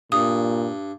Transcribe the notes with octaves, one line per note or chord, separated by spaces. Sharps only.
G2 A#2 D#6